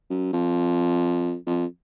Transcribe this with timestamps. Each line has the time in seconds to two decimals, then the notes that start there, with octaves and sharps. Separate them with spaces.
0.10 F#2
0.33 F2
1.47 F2